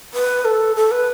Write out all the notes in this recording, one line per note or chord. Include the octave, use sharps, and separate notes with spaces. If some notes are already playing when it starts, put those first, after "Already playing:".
B4
A4
A4
B4